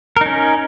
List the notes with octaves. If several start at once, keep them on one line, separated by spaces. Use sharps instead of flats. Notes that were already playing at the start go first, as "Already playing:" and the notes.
C#4 D#4 A#4